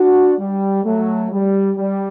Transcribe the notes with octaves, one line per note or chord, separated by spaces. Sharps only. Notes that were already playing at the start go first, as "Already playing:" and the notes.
Already playing: D4 F#4
G3
F#3 A3
G3
G3